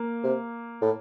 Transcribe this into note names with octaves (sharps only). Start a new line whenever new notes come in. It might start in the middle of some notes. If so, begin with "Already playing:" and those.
Already playing: A#3
C3
A2